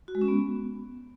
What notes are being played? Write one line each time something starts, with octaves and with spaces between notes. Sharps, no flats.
F#4
G#3
C#4
B3